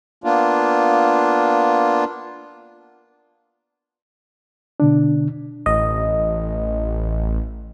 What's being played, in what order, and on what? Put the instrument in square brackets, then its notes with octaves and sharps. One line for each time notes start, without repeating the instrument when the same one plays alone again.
[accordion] A#3 B3 D4 F4
[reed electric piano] B2 D3 D4
[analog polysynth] A1 [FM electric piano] D#5